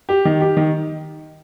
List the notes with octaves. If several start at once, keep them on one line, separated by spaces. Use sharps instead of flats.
G4
D#3
G4
D#3